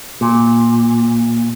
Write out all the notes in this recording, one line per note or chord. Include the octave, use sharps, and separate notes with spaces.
A#2